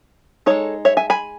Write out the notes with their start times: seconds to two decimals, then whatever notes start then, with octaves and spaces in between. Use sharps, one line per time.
0.46 G#3 D#4 A4 C#5
0.85 C#5 E5
0.97 E5 G#5
1.10 G#5 B5